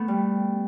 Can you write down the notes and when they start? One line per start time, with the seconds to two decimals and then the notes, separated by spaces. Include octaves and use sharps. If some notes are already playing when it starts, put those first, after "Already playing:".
Already playing: A3 B3
0.08 G3